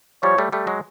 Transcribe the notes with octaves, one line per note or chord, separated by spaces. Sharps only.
F3 G3 C#5
G3 A3
G3 A3
F#3 G#3